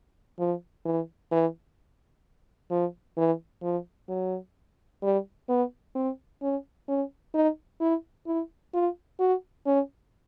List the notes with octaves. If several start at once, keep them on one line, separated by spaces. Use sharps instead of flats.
F3
E3
E3
F3
E3
F3
F#3
G3
B3
C4
C#4
C#4
D#4
E4
E4
F4
F#4
C#4